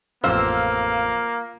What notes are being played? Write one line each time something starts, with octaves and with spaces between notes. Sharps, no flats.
A1 F2 A#3 B3 F4 C5 E6